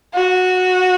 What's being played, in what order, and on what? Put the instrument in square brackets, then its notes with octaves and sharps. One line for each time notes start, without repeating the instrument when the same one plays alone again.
[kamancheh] F#4